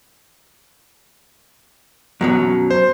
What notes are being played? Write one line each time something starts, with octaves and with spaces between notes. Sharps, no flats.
F#2 B2 F#3
C5